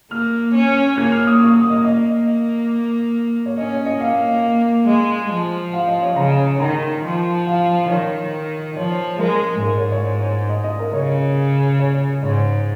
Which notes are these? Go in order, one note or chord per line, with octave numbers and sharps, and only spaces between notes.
A#3 F6
C#4
A#3 G#6
F6
D#6
A#3 C#6
D#6
D#5
D#5
A#3
C#5
C#4 D#5
C#5
D#5
A#3 F5
G#3 D#5
F3
F5
D#5
C#5
C#3 A#5
D#3 A#5
F3
F5
D#3 C#5
F3 C#5
G#3 A#4
G#2 A#4
C#5
C#5
D#5
D#5
A#4
C#3 C#5
C#5
G#2 C#5